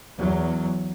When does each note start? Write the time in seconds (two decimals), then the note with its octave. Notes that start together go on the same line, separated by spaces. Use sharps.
0.17 E2 F#3